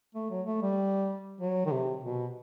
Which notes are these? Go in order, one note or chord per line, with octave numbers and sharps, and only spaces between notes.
A3
F#3
A3
G3
F#3
D#3
C3
B2